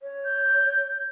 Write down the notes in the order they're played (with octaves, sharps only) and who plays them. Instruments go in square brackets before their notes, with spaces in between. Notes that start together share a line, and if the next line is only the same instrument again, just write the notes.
[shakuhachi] C#5
[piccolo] G6